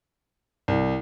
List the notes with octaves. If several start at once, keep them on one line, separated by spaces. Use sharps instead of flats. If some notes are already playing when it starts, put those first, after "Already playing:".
C2